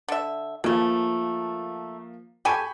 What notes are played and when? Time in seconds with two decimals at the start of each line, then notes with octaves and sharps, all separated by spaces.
0.08 D3 E5
0.64 C#3 F3 A3 A#3
2.45 G4 A4 G#5 B5 C#6 G6